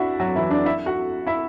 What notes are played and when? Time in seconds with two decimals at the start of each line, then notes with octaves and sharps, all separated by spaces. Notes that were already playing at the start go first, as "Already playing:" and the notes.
Already playing: D4 E4 F#4 E5 F#5
0.20 F#3 F#4
0.36 E3 E4
0.50 D4 D5
0.65 E4 E5
0.86 F#4 F#5
1.27 E4 E5